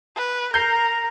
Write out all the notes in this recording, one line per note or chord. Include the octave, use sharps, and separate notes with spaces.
B4
A#4 A#5 G6 C7